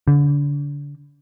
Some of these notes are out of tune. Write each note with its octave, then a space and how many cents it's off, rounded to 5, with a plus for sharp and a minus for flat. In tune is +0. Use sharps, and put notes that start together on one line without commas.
D3 -30